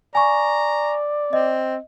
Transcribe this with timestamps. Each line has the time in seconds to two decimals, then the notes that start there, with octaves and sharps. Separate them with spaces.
0.15 D5 G#5 A#5 C#6
1.33 C4 D#5